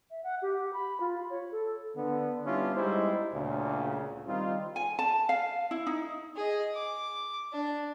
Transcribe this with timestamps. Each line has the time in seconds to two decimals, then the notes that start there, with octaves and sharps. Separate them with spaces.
0.11 E5
0.23 F#5
0.42 G4
0.73 B5
1.00 F4
1.30 C#5
1.52 A4
1.96 D3 B3
2.45 G3 B3 C#4 D4 E4 F4
2.75 G3 G#3 D#4 E4 C5
3.34 D2 A#2 C#3
4.27 D#3 G3 C4 D#4 F4
4.76 G#5
4.99 A5
5.29 F5
5.71 E4
5.87 D#4
6.36 G#4 D#5
6.74 D6
7.52 D4